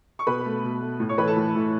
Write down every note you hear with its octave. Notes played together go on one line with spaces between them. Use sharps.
C#6
B2 B4 B5
A3
B2
A3
A2
C#5 C#6
E3 A3 B4 B5
A4 A5
A2
E3 A3